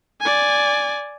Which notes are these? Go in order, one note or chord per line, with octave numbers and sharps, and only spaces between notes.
D5 G#5